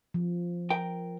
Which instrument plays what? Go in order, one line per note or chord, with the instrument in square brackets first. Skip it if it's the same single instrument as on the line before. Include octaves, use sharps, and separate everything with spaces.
[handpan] F3
[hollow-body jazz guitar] A#4 G5